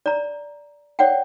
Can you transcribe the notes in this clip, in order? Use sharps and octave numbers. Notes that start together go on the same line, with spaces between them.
D5 A#5
C#5 D5 F#5 G5